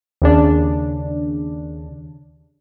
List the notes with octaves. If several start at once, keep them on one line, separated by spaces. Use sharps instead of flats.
D#2 C#3 D4